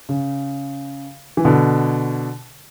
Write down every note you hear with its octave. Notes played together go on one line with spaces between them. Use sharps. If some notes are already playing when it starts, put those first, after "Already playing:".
C#3
E3
B2 D3